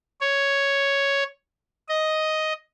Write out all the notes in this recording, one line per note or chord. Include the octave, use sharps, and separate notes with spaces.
C#5
D#5